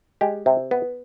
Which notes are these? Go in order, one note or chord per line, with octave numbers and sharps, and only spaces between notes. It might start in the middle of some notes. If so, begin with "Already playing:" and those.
G#3 G4
C3
B3